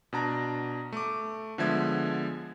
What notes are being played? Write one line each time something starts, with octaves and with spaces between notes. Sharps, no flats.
B2 D4 A5 A#5
A3 D6
D3 F3 G#3 B3 E5 G#6